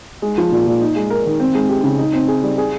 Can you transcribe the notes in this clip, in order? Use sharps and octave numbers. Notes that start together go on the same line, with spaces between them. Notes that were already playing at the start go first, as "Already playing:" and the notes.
G#3
F3
A#2
A#2
D#4
G#3
A#4
D#3
C4
G#3
G4
C#3
D#4
C4
G#4
G3
G#4